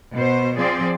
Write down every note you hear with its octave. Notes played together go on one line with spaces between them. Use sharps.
B2 C5
F3 C4 G#4 D5